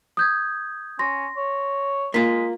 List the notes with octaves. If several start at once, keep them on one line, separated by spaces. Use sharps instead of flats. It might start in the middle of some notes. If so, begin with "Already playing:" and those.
D#6 G6 G#6
C#4 C6 A#6
C#5
G#3 A#3 F4 B6